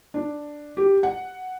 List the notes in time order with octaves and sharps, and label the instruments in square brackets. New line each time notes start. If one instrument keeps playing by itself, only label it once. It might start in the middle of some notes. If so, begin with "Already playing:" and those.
[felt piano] D4
G4
F#5